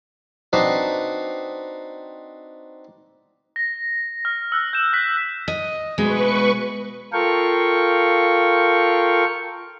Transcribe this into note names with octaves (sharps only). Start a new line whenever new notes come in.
C4 D4 D#4 F#4 B4 C5
A#6
F6
E6 F#6
G6 E7
F#6 B6
D#5
D2 B2 G#3 B4 C#6
F4 A4 A#4 F5 G5 C#6